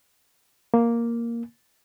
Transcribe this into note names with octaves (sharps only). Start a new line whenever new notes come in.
A#3